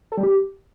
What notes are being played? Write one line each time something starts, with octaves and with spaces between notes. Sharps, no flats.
A4
G3
G4